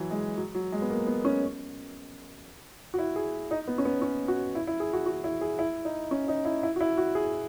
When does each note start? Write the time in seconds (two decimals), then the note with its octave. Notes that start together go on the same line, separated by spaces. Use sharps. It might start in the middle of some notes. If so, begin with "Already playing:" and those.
Already playing: E3 F#3
0.11 G#3
0.37 F#3
0.55 F#3
0.73 G#3
0.82 B3
0.90 A#3
1.07 B3
1.25 C#4
2.94 F#4
2.98 E4
3.16 G#4
3.51 D#4
3.68 B3
3.78 C#4
3.85 B3
4.02 C#4
4.28 F#4
4.55 E4
4.67 E4
4.80 G#4
4.93 F#4
5.06 F#4
5.24 E4
5.41 G#4
5.59 E4
5.85 D#4
6.11 C#4
6.28 D#4
6.45 E4
6.63 E4
6.76 F#4
6.81 E4
6.98 F#4
7.15 G#4